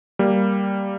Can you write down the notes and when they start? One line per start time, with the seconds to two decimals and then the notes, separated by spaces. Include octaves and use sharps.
0.19 G3 A#3